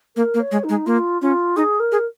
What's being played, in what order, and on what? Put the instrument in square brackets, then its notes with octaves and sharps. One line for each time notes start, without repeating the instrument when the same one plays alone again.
[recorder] A#3 [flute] A#4
[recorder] A#3
[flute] C#5
[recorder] G#3
[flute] D#4
[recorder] G#3
[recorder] A#3 [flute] F4
[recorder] C#4 [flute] F4
[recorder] D#4 [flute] G#4
[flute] A#4
[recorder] G#4